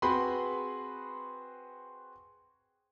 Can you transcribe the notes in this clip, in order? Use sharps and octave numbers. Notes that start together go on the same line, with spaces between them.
C4 F#4 G#4 B4 B5 C6